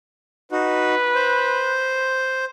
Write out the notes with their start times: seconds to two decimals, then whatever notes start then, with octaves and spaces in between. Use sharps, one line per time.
0.52 D#4 F#4 B4
1.15 C5